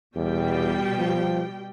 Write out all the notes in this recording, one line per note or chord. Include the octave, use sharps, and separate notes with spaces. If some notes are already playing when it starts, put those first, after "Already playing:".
E2 B2 G3 G5
F3